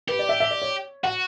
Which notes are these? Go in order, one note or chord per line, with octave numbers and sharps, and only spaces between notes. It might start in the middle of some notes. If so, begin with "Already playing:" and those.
G4 B4
D5
E5
E5
D5
C#5
F#4 F#5